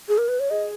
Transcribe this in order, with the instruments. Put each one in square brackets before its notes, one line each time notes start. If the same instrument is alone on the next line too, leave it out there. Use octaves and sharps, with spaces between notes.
[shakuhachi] G#4
A#4
B4
C#5
[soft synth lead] G#4 [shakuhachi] D#5